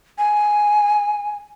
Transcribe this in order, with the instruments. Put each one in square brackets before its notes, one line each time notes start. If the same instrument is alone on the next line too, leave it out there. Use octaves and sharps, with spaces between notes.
[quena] G#5